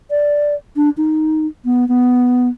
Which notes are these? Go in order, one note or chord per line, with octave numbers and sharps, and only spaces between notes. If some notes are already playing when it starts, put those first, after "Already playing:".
D5
D4
D#4
B3
B3